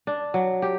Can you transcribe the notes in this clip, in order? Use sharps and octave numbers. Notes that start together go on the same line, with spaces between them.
D4
F#3
G4